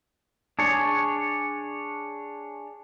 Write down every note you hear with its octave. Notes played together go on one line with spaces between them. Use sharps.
D4 G#4 C#5